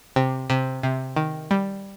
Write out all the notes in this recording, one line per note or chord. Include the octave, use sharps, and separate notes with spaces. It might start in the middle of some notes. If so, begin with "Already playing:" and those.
C3
C3
C3
D#3
G3